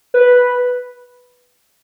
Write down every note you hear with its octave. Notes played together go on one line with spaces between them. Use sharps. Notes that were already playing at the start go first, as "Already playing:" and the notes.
B4